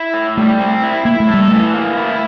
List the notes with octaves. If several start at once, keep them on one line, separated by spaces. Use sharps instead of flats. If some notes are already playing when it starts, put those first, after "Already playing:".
Already playing: E4
A2
G3 A3
C4
E4
A#3 E4
A3
G3 A4
E3 A3
A#3
E4